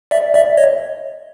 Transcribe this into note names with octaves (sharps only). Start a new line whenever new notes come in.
D5 E5
D5 E5
C#5 D#5